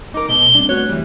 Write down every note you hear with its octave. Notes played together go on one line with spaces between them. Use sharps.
D#4 A#4 D6
B2 A3 G7
G3 C4 D4
A3 B3 F#4 C#5 F#6
E3 G3